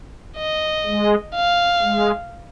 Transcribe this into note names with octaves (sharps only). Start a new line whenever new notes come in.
D#5
G#3
F5
G#3